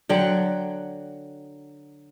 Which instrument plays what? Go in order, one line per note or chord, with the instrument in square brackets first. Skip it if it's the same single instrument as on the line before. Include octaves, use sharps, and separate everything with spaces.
[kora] D3 F#3 F#5 G5